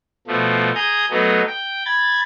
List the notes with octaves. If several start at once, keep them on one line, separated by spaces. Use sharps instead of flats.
B2 F3 A3
G#4 A#5 D#6 G6
F#3 A3 B3 D#4
G5
B5 G#6 A6